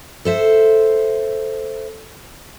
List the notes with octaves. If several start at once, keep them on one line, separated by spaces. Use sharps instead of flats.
A4 C5 E5